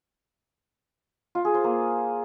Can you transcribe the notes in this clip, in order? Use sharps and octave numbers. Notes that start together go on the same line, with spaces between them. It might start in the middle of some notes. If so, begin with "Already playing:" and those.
F4
G#4
C5
A#3